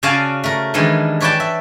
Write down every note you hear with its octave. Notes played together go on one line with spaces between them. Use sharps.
C#3 F#4 D5 F5 G#5 A5
A3 A#4
D#3 E3 G3 G#3 D4
B4 C#5 D5 F#5 G5 A5
E5